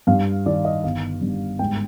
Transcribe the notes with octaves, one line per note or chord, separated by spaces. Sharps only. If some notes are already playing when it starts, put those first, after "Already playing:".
G2 F5
D#3 D5
D#5
G1 F5
G2
G#2 G5